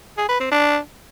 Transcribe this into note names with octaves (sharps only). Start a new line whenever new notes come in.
G#4
B4
C4
D4